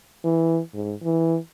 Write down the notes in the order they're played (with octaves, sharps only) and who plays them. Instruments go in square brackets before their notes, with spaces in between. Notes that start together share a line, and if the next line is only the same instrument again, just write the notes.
[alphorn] E3
G#2
E3